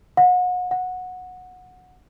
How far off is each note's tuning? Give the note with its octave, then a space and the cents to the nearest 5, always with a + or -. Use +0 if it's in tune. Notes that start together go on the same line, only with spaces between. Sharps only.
F#5 -35
F#5 -15